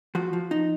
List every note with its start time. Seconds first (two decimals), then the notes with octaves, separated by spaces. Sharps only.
0.15 F3 F#4
0.33 F3
0.51 D#4